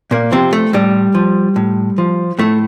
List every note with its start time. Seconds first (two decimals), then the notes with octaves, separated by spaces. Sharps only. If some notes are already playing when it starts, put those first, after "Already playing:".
0.11 A#2 A#3
0.32 C3 F3 C4
0.53 A3
0.73 A2 G3
1.15 F3
1.56 A2
1.98 F3
2.39 A2 A3